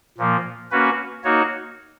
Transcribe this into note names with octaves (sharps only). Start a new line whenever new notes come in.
A#2 F3 A#3
A#3 C#4 F#4 B4
A#3 D#4 F#4 C#5